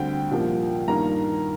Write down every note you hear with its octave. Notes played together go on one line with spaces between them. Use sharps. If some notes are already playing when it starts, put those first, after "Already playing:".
Already playing: D2 D3 G3 C4 G5
C2 A#2 F3 A#3
G2 D#3 A#3 A#5